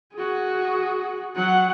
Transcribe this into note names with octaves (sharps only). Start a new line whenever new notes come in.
F#4 G#4
F#3 F#5